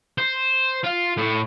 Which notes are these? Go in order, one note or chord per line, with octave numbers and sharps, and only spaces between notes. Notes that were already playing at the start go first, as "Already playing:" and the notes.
C5
F4
A2